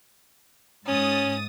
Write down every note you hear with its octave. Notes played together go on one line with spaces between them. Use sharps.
G#2 C#4 D#6 A6